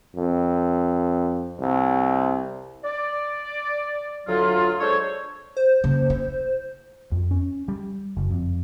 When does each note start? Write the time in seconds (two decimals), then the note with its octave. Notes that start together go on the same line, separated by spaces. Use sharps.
0.16 F2
1.60 C2
2.84 D5
4.27 D2 F#3 F4
4.80 G#3 D4 A4 C5 C#5
5.57 C5
5.84 C#3 A#3
6.10 E4
7.12 F2
7.31 C#4
7.68 G3
8.17 F#1
8.30 F2